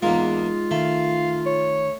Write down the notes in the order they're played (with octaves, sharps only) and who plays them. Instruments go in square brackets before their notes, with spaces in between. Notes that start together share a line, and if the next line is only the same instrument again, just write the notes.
[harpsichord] E2 A#3 [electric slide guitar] G#3 D#4 [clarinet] F4
[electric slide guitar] D#3 [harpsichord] A3 [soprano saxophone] F5
[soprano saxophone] C#5